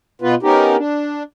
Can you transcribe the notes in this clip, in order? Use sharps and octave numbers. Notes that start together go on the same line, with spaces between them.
B2 B3 F4 B4
B3 C#4 D#4 G4 A#4
D4